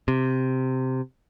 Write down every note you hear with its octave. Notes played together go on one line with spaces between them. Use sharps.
C3